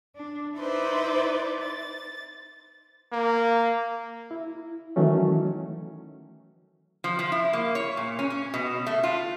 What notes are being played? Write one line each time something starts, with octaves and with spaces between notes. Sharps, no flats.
D4
D#4 E4 B4 C5 D5
A6
A#3
E4
D#3 E3 F#3 A3 C#4
F3
F3
E4
A#3
C#5
A#2
C#4
C#4
B2
A3
F4